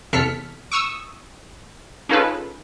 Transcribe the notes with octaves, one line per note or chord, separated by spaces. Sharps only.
E2 C3 A4 F6 B6 C#7
C#6 D#6 E6
C#4 D#4 F4 G#4 A4 B4